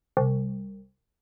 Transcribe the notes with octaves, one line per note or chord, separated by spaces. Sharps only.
C2